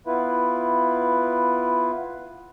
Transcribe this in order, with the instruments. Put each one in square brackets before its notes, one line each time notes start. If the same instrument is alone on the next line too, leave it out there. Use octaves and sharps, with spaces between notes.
[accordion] B3 E4 F4 B4